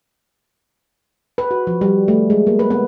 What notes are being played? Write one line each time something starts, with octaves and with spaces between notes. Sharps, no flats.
B4
F#4
F3
G3
A3
G#3
A#3
B4
B3